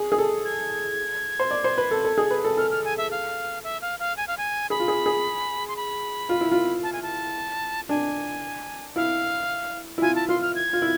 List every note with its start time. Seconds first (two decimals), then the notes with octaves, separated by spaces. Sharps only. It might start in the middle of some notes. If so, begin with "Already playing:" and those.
Already playing: G#4
0.12 G#4
0.18 A4
0.45 G#6
1.40 C5
1.51 D5
1.64 C5
1.78 B4
1.91 A4
2.05 A4
2.18 G#4
2.31 B4
2.45 A4
2.57 A4 F6
2.71 F6
2.84 G#5
2.98 E5
3.11 F5
3.64 E5
3.81 F5
3.99 F5
4.17 G#5
4.28 F5
4.38 G#5
4.70 G#4 B5
4.80 F4
4.88 G#4
5.06 G#4
5.68 C6
5.77 B5
6.29 F4
6.41 E4
6.52 F4
6.83 A5
6.93 G#5
7.03 A5
7.89 D4 G#5
8.96 E4 F5
9.98 E4
10.02 F4 G#5
10.16 A5
10.29 F4 C6
10.42 F6
10.55 G#6
10.73 F4
10.82 E4